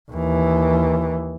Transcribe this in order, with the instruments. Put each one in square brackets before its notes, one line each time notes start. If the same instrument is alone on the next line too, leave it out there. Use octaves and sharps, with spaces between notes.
[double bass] D#2 E3